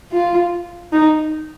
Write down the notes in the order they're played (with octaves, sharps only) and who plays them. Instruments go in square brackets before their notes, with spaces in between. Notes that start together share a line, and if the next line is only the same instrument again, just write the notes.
[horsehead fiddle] F4
D#4